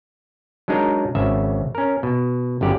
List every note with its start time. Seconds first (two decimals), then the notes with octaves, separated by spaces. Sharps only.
0.68 F#3 G#3 D4 D#4 A#4
1.15 G#1 C#3 E5
1.75 C#4 A#4
2.03 B2
2.61 G1 F#2 G4 D5